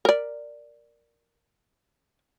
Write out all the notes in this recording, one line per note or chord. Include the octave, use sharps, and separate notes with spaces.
A#4 D5